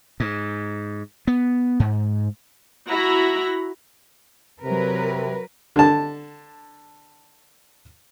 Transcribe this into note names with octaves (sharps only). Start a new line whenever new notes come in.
G#2
B3
G#2
E4 F#4 A#5 B5
C3 F#3 A#4 B4
D3 A5